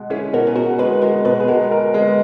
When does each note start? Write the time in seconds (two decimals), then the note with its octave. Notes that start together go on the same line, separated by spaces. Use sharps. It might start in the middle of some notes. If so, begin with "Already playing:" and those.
Already playing: B2 G#3
0.10 C#4 E4 G#4
0.33 B2 F#4 A#4
0.47 G#4
0.56 B2 F#4 A#4
0.78 G#3 G#4 B4
1.02 G#3 F#4 A#4
1.25 B2 G#4 B4
1.40 G#4
1.48 G#3 F#4 A#4
1.71 A#4
1.94 G#3 G#4 B4